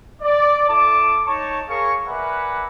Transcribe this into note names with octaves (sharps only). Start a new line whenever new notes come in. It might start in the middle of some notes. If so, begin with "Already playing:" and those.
D5
E4 A4 A5 D6
D#4 C#5 A5 C#6
G#4 A#4 C#5 F5 C#6
A#4 B4 D5 E5 F#5 G#5